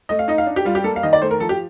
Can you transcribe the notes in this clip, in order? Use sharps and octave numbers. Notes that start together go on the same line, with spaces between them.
A3 D#5
F5
D#4 D#5
F5
D4
G4
G3 F4
G4
A#3 A4
F5
D#3 D#5
D5
A3 C5
A#4
F3 A4
G4